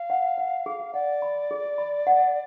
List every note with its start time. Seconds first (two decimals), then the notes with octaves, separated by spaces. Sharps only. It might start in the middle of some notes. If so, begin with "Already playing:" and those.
Already playing: F5
0.10 F#5
0.38 F#5
0.66 G#4
0.94 D5 F#5
1.22 B5
1.51 G#4
1.78 B5
2.07 F#5